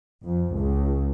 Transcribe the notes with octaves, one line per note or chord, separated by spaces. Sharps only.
F2
C#2